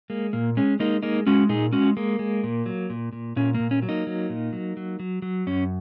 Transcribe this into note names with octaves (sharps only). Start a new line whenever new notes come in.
G#3 A#3
A#2 A#3
G#3 C#4
G#3 A#3 D#4
G#3 A#3 D#4
G#3 C#4 F#4
A#2 D#4 G#4
G#3 C#4 F#4
G#3 A#3
G#3
A#2
F#3
A#2
A#2
A#2 C#4
A#3
A#2
C#4
F#3
A#3 D#4
F#3
A#2
F#3
F#3
F#3
F#3
F#2 C#4